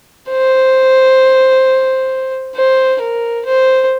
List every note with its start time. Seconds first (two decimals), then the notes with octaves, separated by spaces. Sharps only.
0.30 C5
2.55 C5
3.01 A#4
3.45 C5